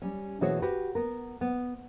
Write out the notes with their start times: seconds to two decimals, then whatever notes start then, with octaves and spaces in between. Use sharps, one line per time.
0.02 G3 C#4
0.41 B2 E3 A3 F#4 G#4 C#5
0.62 F#4 G4 B4
0.95 B3 A#4
1.41 B3